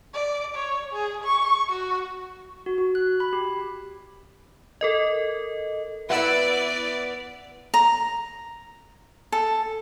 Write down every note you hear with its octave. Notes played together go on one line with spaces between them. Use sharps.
D5
C#5
G#4
C#6
F#4
F#4
F#4
F#6
B5
G4
A4 A#4 D#5
B3 E4 B4 D5 F#5 E6
A#5
A4